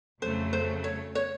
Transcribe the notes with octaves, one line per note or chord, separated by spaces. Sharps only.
F2 C#3 F#3 A3 C5
C5
C#5
C#5